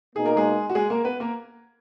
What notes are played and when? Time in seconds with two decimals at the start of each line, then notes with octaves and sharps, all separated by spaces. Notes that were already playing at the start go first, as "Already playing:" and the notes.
0.16 B2 A#3 D#4 G#4
0.26 A#4
0.36 G#3 G#4
0.69 F#4
0.75 G#3 G#4
0.90 A#3 A#4
1.05 B3 B4
1.20 A#3 A#4